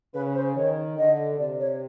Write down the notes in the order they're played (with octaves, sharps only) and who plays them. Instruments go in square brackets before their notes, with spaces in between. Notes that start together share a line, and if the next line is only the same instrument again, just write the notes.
[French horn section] C#3 [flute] B4
[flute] C5
[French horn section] D#3 [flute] C#5
[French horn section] D3 [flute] D#5
[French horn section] C3 [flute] D5
[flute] C#5